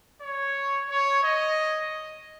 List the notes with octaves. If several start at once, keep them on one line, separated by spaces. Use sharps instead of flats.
C#5
C#5
D#5